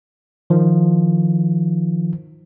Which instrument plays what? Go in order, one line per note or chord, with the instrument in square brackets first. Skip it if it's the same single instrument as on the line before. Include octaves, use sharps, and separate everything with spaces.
[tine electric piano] D#3 F3